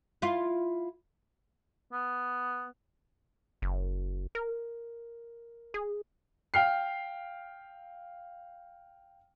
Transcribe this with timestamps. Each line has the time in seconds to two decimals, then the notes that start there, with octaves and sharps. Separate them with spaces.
0.22 E4 F4
1.93 B3
3.62 F#1
4.35 A#4
5.74 G#4
6.54 F5 G5 F6 C7